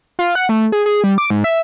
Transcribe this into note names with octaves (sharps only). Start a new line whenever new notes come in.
F4
F#5
A3
G#4
G#4
G3
D6
G#2
E5